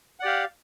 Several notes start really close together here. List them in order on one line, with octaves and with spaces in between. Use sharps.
F#5 D5 G4 F5